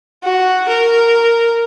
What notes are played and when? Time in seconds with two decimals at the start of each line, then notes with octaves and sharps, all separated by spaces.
0.24 F#4
0.69 A#4